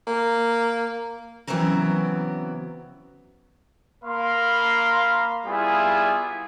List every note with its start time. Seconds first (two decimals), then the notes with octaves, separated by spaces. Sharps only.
0.07 A#3
1.47 C#3 E3 F#3 B3 C4 A#4
4.04 A#3 A#4 F5 B5 C6
5.46 G3 B3 E4 F4 G#4